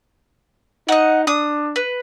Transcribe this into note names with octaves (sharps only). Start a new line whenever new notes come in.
D#4 D#5 F#5
D4 D#6
B4